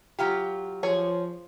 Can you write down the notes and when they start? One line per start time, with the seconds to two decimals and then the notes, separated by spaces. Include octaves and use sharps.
0.19 F#3 F4 G4
0.83 F3 G#4 C#5